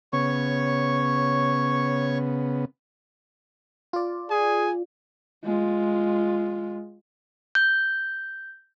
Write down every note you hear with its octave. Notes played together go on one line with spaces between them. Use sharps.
C#3 B3 C#5 C#6
F4 D5
G#4 G#5
G#3 F4
G6